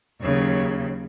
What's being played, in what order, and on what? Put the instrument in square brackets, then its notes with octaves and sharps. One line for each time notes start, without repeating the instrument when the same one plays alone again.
[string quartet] D#2 C#3 F#3 C#5